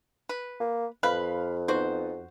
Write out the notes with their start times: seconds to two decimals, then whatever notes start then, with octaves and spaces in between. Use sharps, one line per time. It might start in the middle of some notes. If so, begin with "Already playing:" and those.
0.29 B4
0.60 A#3
1.03 F2 B4 F5 B5 F#6
1.68 B3 D#4 F#4 C5